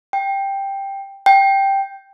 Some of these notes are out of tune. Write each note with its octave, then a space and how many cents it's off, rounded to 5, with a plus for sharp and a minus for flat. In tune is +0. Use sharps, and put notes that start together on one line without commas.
G5 +5
G5 +0